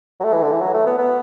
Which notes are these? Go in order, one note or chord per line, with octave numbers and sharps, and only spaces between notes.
F#3
A3
E3
D3
E3
F#3
A3
B3
B3